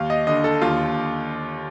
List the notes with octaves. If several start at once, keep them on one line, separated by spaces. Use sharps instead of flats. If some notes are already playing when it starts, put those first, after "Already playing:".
Already playing: D#2 F5
D#5
D3 D#5
A4
D#2 F4